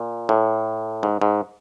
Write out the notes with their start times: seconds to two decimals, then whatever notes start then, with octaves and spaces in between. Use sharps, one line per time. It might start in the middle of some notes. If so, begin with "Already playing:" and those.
Already playing: A#2
0.29 A2
1.03 G#2
1.22 G#2